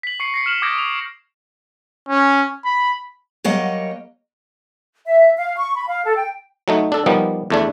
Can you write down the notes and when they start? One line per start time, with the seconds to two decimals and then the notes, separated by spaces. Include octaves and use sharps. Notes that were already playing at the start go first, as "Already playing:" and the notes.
0.03 B6 F#7
0.20 C#6 C7 C#7
0.34 A#6 C7 C#7
0.46 F6 E7 F#7
0.62 D6 D#6 G6 G#6 A#6 D7
0.78 F7
2.09 C#4
2.65 B5
3.44 F#3 G3 A#3 C#5 D#5 F#5
5.06 E5
5.37 F5
5.57 C#6
5.76 B5
5.88 F5
6.04 A4
6.16 G5
6.68 F#3 A3 D#4
6.92 D4 A4
7.06 F3 G3 A#3 B3 D#4
7.50 E2 A3 D4